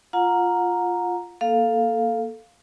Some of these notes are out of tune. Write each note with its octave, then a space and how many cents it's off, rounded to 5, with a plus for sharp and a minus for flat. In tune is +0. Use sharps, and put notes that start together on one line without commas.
F4 +0 F#5 -35 A#5 +0
A#3 +0 A4 +0 F5 +0